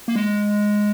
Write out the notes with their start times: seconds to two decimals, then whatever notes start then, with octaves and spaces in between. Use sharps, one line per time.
0.08 A#3
0.15 G#3